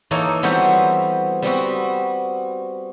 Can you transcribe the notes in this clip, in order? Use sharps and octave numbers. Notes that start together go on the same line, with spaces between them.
E3 A#3 D#4 A4 C#5 D#5
E3 G3 B3 C4 F#4 C5
G3 B3 C4 F#4